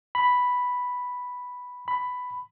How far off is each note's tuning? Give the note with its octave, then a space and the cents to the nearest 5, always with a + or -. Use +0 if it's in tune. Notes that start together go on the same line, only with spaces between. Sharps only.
B5 +0
B5 +10